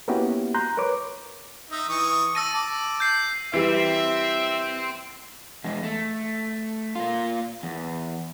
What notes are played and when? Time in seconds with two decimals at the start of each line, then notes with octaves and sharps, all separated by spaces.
0.08 A#3 B3 C#4 E4 F#4 G4
0.54 A#5 C6 F#6 G6
0.77 A#4 B4 C#5 D6
1.71 D#4 E5
1.89 E3 C#6 D#6
2.35 A5 E6 A#6 D#7
2.54 A5 D6
3.00 G6 C7
3.54 E3 G3 C4 E5
5.64 E2 G#3
5.83 A3
6.95 A#3 F4
7.63 E2